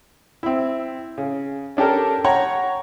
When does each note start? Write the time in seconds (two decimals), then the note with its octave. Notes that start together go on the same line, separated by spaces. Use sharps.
0.43 C4 E4
1.18 C#3
1.77 C#4 D4 G4 A4 A#4
2.25 C#5 F#5 G5 A#5 C#6